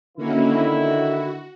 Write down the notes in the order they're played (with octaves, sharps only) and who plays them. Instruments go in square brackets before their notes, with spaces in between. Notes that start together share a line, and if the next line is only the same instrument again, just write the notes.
[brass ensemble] D3 D#3 E4 [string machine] A#3 C#4 F#4
[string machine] F#4